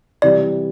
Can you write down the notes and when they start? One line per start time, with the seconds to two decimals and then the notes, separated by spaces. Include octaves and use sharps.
0.22 C3 E3 G3 D5